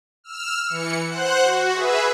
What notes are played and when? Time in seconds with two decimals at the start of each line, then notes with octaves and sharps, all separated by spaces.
0.24 E6 F6
0.67 E3 C#7
1.06 C5 F#5 F#6
1.43 F#4
1.73 G#4 B4 E5